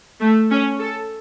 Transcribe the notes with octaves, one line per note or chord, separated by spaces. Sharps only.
A3
C#4
A4